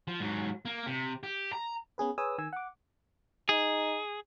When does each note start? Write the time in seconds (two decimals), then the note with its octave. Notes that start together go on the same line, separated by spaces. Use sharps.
0.08 F3
0.20 G#2 F#3
0.65 A#3
0.87 C3
1.23 G4
1.53 A#5
1.98 B3 C#4 G#4 B4
2.18 G#4 B4 C#5 G#5 D#6 E6
2.38 D#3 G#5 E6
2.53 F#5 D6
3.49 D#4 G#4